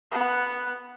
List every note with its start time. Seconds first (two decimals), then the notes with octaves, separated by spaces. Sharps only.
0.11 B3 F#5